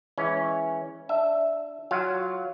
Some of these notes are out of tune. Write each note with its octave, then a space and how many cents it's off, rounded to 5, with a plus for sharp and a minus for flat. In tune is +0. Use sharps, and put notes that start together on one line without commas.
E3 +0 G#3 +0 C#4 +0
D4 +0 E5 +0
F#3 +0 F4 +0 F5 +0